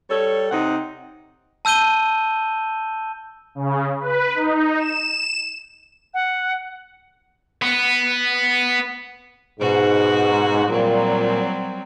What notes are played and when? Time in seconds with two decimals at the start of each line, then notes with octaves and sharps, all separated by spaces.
0.10 G3 A4 C#5
0.51 C3 C4 D#4 F#5
1.65 A5 E6 G6 D#7 G7
3.55 C#3
4.00 B4
4.35 D#4
4.79 E7
6.14 F#5
7.62 B3
9.60 G#2 B2 F#4
10.69 A#2 F#3 G3 C4